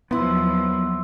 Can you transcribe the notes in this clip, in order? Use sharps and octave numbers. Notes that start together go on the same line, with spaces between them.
D#2 F3 F#3 B3 E4 B4 C6 E6